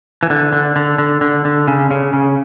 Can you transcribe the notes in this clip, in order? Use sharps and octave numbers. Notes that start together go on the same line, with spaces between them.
E3
D3
D3
D3
D3
D3
D3
C#3
C#3
C#3